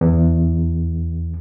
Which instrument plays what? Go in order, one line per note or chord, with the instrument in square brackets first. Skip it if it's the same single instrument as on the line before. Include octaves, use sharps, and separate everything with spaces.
[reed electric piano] E2